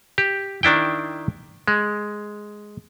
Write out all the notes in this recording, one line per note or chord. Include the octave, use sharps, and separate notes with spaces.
G4
D#3 D4 E4 G5
G#3